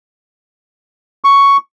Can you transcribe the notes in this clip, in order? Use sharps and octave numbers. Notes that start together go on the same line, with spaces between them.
C#6